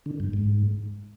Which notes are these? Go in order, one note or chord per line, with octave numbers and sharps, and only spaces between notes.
D3
G2
G#2